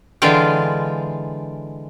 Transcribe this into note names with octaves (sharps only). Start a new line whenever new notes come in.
D3 E3 G#3 F4 F5 G5